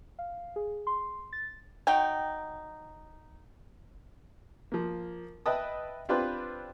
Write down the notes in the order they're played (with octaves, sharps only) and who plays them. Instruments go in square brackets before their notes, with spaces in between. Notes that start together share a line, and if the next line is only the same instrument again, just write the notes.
[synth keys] F5
G#4
C6
A6
[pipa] F#3 D#4 [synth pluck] G5
[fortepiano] F3 A#3
B4 D#5 E5 G5 A5 D#6
C4 D4 F4 G4 B4 C5